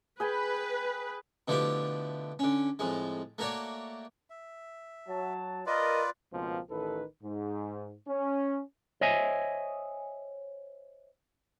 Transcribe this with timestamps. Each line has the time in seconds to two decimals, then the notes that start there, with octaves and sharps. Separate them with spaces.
0.20 G#4 B4 G5 G#5
1.48 B2 D3 F3 A3 E4 G4
2.39 D3 C#4
2.79 F2 A2 G#3
3.38 A3 A#3 F#4 C#5 D5
4.30 E5
5.09 F#3 A5
5.66 F4 A#4 B4 D5 D#5
6.33 C#2 B2 F3 A#3 C4
6.70 A1 D#3 A4 B4
7.23 G#2
8.08 C#4
9.01 C5 C#5 D#5 E5 G#5